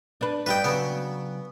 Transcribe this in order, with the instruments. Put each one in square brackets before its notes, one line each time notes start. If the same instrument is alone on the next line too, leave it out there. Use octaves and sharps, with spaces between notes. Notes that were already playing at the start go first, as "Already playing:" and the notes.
[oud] D4 B4
[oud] G2 G3 D#5 [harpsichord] B4 G5
[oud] C#3 F#3 [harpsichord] B3